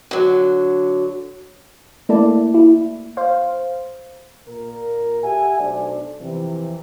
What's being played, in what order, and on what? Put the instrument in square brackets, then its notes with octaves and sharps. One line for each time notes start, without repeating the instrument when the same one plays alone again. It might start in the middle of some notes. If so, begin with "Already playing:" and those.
[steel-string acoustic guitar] D3 F#3
[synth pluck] A3 A#3 E4 A4 D5
E4
C5 F5
[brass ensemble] A#2 A#4
G4 A4 E5 F#5 G#5
B1 A3 D4 C5 D5
F2 C3 E3